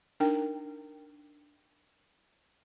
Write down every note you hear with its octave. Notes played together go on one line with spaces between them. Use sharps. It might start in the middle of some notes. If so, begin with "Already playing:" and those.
D4 D#4 A#4 G5